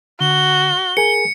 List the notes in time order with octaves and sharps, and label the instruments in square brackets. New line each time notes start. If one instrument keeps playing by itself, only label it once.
[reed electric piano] D3 [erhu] F#4 [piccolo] G7
[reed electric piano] G#4 A#4 G#5 [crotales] C#7